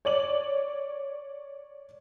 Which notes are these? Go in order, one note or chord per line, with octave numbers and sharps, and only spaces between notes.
C#5 D5 F#7